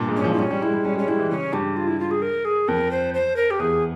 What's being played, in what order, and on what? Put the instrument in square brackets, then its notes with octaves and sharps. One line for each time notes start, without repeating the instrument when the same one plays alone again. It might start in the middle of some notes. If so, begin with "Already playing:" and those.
Already playing: [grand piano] G2 A#2
G#2
[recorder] C#4
[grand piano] F3
[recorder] E4
[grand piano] G3 [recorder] C#4
[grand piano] G3
[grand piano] G#3 [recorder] E4
[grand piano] G3
[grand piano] G3 [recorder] C#4
[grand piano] G#3
[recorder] C#4
[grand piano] G3 [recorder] E4
[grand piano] E3
[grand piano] C#3 [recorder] C#4
[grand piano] G2 [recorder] G4
[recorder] F4
E4
F4
G#4
A#4
G#4
[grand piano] F2 [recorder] A#4
[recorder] C5
C5
A#4
G4
[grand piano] E2 [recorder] G#4